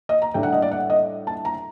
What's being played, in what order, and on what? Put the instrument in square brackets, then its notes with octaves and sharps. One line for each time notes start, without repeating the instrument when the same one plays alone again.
[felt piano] D#5
A#5
A2 G3 D4 G5
F#5
D#5
D5
F#5
D#5
A5
A#5